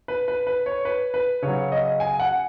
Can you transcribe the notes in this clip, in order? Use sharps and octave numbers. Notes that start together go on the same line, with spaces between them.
B4
B4
B4
C#5
B4
B4
C#3 F#3 C#5
D#5
G#5
F#5